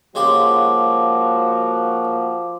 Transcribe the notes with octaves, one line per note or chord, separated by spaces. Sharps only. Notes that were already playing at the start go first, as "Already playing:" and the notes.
C#3 F3 G#3 A#3 F#4 G4 C6 D6